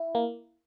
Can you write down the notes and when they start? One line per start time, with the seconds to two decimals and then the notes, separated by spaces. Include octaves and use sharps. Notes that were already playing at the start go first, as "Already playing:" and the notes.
Already playing: E4
0.15 A#3